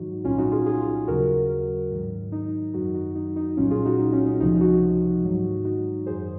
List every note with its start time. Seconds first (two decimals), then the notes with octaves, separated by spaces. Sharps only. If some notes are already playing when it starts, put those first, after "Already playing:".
Already playing: G#2 D#3 F#3 D#4 F#4
0.24 C2 A#2 F#3 C#4 F4
0.38 D#4 F#4
0.52 F4 G#4
0.66 F4 G#4
1.07 D#2 C#3 F#3 F#4 A#4
1.91 G#2 D#3 F#3
2.32 D#4
2.74 F#2 D#3 F#3 D#4 F#4
2.94 D#4 F#4
3.15 D#4
3.36 D#4
3.57 C2 A#2 F#3 C#4 F4
3.71 F4 G#4
3.85 D#4 F#4
3.99 D#4
4.13 C#4
4.26 D#4
4.40 C#2 C3 F3 D#4
4.61 D#4 F#4
5.24 G#2 D#3 F#3
5.65 D#4 F#4
6.06 F#2 D#3 F#3 G#4 C5